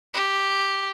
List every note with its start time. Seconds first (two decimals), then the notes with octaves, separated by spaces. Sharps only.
0.14 G4